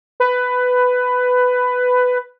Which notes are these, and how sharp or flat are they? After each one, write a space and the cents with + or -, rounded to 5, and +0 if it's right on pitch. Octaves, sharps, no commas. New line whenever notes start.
B4 +10